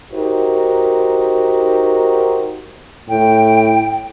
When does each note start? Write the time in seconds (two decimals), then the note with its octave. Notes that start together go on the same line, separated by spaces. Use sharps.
0.12 D#4 F#4 G4 A#4 C5
3.09 A2 G5